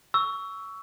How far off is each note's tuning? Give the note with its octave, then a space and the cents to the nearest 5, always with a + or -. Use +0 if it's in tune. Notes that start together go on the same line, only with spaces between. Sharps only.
C#6 +20 E6 +0